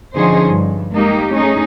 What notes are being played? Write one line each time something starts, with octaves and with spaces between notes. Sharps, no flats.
D3 F3 C#4 D#4 G#4 C5
G2
G#3 A#3 D#4 G4
A3 C#4 D#4 G#4